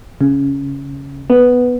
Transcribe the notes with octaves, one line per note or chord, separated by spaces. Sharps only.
C#3
B3